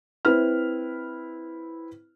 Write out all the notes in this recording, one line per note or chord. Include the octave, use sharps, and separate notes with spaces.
C4 E4 B4 F6